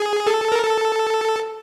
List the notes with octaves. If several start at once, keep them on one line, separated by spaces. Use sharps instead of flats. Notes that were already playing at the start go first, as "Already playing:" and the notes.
Already playing: G#4
A4
A#4
A4